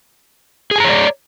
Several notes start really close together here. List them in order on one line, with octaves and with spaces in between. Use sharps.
G#4 G#5 A#5 C#5 D5